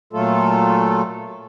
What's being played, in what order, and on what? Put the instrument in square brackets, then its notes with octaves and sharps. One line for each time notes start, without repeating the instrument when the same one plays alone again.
[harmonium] A#2 F#3 A3 F4 A4